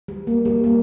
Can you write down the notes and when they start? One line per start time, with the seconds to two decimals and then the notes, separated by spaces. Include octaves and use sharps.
0.08 G3
0.27 A#3
0.45 G3
0.64 A#3